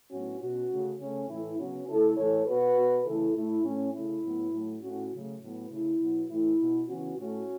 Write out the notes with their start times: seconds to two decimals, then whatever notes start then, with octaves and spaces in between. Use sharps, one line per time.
0.10 A2 F#3 B3 C#4 F#4
0.40 B2 B3 C#4 F#4
0.70 C#3 A3
0.99 C#3 A3 C#4
1.28 A2 E3 A3 E4
1.57 C#3 F#3 B3 C#4 F#4
1.87 C#3 A3 E4 A4
2.16 A2 E3 A3 A4 C#5
2.46 B2 B3 F#4 B4
2.75 B2 B3
3.05 C#3 E3 A3 E4 A4
3.34 A2 A3 E4
3.63 A2 A3 C#4
3.93 C#3 A3 E4
4.23 A2 F#3 B3
4.52 A2 F#3 A3
4.81 A2 A3 C#4 F#4
5.12 C#3 F#3 A3
5.41 A2 F#3 B3
5.70 C#3 A3 E4
5.99 B2 F#3 B3
6.28 A2 E3 A3 E4
6.59 B2 B3
6.87 C#3 E3 B3 C#4 F#4
7.17 A2 A3 C#4 F#4